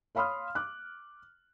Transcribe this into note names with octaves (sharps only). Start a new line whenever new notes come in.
C#5 F5 B5 C6 D#6 F6
D6 F#6